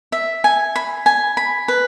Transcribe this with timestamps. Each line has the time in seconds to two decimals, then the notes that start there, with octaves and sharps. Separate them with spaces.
0.12 E5
0.44 G#5
0.76 B5
1.06 G#5
1.37 B5
1.68 B4